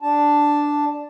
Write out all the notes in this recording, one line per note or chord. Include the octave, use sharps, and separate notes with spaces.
D4 A5